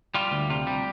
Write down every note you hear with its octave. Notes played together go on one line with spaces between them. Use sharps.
G3 F4
D2
C3 F4
G3